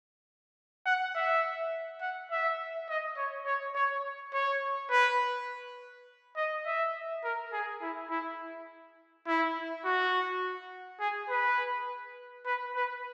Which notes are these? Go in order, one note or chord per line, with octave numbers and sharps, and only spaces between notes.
F#5
E5
F#5
E5
D#5
C#5
C#5
C#5
C#5
B4
D#5
E5
A#4
G#4
E4
E4
E4
F#4
G#4
B4
B4
B4